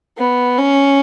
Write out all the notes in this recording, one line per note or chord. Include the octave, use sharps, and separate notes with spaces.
B3
C#4